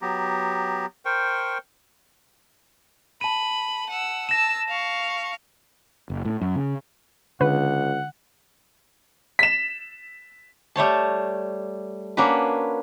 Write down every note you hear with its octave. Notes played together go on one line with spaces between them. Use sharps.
F#3 B3 G4 A#5
A#4 C5 G5 C#6
A5 B5 D#7
F#5 E6
A5 E6 A#6 E7
F5 C#6
F#1
A2
F#2
C#3
C#2 D3 B4 F#5
B6 E7
G3 A3 C#5 A5
A#3 C#4 D4 F#4 B4